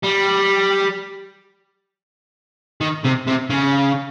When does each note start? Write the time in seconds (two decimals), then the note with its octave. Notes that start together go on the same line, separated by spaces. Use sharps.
0.04 G3
2.81 D#3
3.05 C3
3.28 C3
3.50 C#3